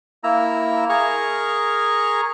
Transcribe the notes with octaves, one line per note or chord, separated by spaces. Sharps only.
A#3 E4 A#5 E6
G#4 A#4 A#5 C#6 F6